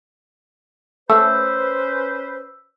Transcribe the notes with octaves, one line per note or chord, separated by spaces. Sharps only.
A3 C#4 B4 C5 E6